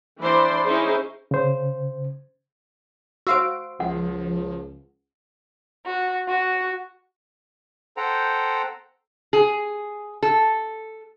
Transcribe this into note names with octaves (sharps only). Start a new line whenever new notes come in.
E3 D4 C5 D5 B5 C6
C#4 D#4 E4 G#4 C5
C#3 C5
F#4 C5 F5 C6 E6 D7
C#2 F3 F#5
F#4
F#4
A4 C5 F#5 G5 A#5
G#4
A4